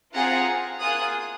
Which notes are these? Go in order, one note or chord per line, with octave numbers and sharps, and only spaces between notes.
C4 F4 G#4 F#5 A#5
A#3 F4 G#4 D#6 F#6